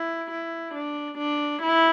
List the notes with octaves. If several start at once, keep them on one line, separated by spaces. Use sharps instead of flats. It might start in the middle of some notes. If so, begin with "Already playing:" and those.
Already playing: E4
E4
D4
D4
E4